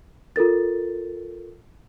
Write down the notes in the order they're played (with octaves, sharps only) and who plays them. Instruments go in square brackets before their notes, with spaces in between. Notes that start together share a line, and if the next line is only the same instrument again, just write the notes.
[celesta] F4 A4 A#4 A6